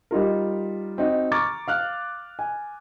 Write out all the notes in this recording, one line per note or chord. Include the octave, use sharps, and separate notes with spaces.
G3 D#4 F4 A#4
C4 D#4 F#4
A#5 C#6 D6 F6 A6
F5 F6 F#6
G#5